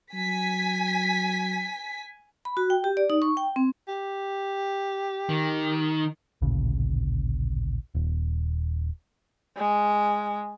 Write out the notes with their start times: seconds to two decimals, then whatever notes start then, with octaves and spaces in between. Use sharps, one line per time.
0.14 F#3 G#5 B6
2.45 B5
2.57 F#4
2.70 G5
2.84 G4
2.97 D5
3.10 D#4
3.22 C#6
3.37 G5
3.56 C4
3.88 G4
5.29 D#3
6.42 A1 D2 A#2 C#3
7.95 D#1
9.56 G#3